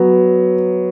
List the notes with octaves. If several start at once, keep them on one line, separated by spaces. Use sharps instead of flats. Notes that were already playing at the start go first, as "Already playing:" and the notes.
Already playing: F#3 B3